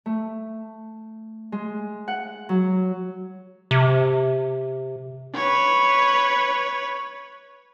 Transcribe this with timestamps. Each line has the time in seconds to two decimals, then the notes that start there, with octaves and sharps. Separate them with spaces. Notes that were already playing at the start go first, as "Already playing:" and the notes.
0.06 A3
1.52 G#3
2.08 F#5
2.49 F#3
3.71 C3
5.35 B4 C#5